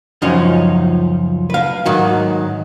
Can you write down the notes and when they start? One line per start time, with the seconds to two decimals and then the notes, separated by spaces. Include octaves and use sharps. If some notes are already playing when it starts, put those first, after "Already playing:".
0.22 C#2 F#2 F3 C#4 D#4 C#5
1.50 B4 F5
1.86 G#2 D#3 F#3